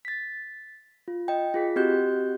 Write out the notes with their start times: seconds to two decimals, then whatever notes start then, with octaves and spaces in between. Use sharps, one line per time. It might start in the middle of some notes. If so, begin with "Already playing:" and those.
0.05 A6 B6
1.08 F4
1.28 D#5 G5
1.54 F4 G#4 B6
1.76 C4 F#4 G4 D#5 F#6 G6